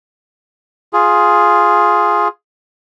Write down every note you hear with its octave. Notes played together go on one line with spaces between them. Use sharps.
F4 G#4